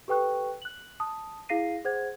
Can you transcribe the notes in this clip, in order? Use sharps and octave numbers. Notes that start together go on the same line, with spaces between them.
G4 A4 B4 G5 C#6 F#6
F#6 F#7
A5 D#6
E4 G#4 F5 A#6 C7 D#7
G#4 C5 F#5 G#6